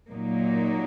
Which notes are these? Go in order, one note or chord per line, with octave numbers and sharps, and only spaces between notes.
A#2 F#3 A#3 D#4